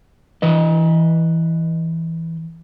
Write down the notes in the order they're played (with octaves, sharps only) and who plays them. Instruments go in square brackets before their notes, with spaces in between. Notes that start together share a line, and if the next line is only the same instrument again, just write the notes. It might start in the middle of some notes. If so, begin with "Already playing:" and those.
[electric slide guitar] E3 B4 D#5